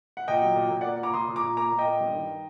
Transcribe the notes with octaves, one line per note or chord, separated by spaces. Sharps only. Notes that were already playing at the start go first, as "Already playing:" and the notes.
F#5
A#2 D#5 G5
F#3
A#2
A#2
A#3 D5 F#5
A#2 A#5 D6
A#2 C6 D#6
A#2
A#5 D6
A#2
A#3 A#5 D6
A#2
D#5 G5
A#3
G2
D#3